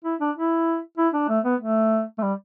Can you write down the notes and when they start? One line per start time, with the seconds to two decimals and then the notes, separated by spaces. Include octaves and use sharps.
0.04 E4
0.20 D4
0.36 E4
0.98 E4
1.14 D4
1.29 A3
1.45 B3
1.60 A3
2.18 A3
2.23 G3